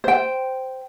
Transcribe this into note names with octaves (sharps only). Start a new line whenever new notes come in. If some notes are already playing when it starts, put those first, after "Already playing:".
C5 G5